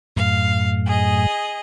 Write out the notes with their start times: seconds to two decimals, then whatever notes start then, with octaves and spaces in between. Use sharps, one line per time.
0.16 F#2 A2 F5
0.86 G#4 D#5